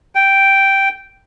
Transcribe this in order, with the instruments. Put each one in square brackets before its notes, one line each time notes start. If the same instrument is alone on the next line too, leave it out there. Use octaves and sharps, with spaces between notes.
[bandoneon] G5